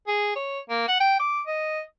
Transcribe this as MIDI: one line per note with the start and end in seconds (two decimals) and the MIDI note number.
0.08 0.33 68
0.36 0.60 73
0.70 0.87 58
0.88 0.97 78
1.00 1.18 79
1.20 1.42 86
1.47 1.82 75